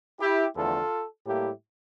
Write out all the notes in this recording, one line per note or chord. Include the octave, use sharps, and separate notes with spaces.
E4 G4
E2 D3 F3 A3 F4 A4
A2 G3 A#3 E4 G4